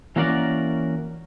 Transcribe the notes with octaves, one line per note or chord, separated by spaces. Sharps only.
E3 A#3 C#4 F#4 A#4 D5